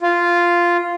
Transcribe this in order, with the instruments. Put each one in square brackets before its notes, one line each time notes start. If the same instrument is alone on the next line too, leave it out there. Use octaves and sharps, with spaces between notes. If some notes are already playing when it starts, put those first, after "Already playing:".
[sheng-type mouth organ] F4